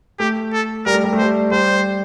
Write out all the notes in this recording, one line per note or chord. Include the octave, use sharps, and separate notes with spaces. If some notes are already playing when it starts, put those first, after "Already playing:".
A3 G4
A4
G3 A#4
A3
G3
A3
G3 C5
G3 C5